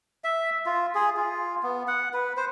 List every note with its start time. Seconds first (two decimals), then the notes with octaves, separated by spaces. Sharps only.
0.24 E5
0.66 F4
0.95 G#4
1.17 F4
1.63 B3
1.87 F#5
2.13 B4
2.37 C5